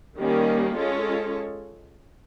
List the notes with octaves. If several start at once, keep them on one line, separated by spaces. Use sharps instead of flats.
D#3 G3 A#3 C#4
G#3 C#4 F4 A4 C#5